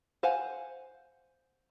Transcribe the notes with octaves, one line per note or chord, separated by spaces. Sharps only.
C5 F5 F#5 G#5